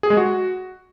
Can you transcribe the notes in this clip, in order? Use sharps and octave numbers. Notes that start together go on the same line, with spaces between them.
G#4
G#3
F#4